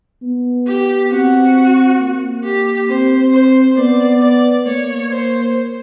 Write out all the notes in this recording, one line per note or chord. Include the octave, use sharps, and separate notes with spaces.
B3
G4
C4 F#4
A#3
G4
C4 C5
C5
B3 D5
D5
A#3 C#5
C5